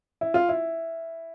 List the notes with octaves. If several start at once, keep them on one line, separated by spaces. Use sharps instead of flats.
E4
F4
E4